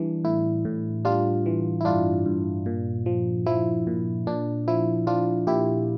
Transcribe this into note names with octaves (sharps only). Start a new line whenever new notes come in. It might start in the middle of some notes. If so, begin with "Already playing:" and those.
Already playing: E3 G3 D4
A2 E4
A2
G3 D4 F4
E3
E4
G2 D4 F4
G2
A#2
F3
F3 E4
A#2
A#2 D4
F3 E4
F3 D4 F4
A#2 E4 G4